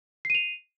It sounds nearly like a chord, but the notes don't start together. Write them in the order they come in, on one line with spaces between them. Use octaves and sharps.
C7 D#7 F7